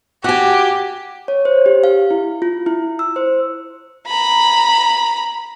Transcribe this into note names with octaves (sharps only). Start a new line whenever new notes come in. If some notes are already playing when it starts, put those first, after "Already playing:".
F#4 G4 G#5
C#5
C5
G4
F5
E4
F4
E4
E6
C5
A#5 B5